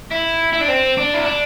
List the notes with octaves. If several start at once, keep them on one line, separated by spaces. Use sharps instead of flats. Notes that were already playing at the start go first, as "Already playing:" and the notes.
E4
E4
D4
C4
D4
E4
D4